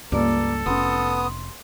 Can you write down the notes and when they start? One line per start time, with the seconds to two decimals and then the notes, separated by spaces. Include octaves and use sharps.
0.12 C#2 G2 A#3 A4 D5 D6
0.66 F1 B3 C#4 C6 D#6